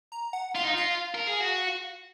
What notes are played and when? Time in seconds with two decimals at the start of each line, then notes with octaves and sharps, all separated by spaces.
0.12 A#5
0.33 F#5
0.55 F4 F5
0.64 D#4
0.73 F4 F5
1.15 A#4
1.27 G#4
1.41 F#4